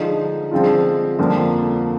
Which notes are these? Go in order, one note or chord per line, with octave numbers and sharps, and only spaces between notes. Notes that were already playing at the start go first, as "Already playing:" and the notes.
Already playing: D3 F3 G#3 D#4
D3 F3 G#3 C4 F4
F2 D3 F3 A#3